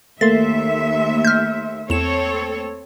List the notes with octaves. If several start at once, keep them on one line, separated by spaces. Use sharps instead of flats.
D#2 A3 A#3 E5 C6 A6
F6 G6
E2 C4 A4 C#5 E7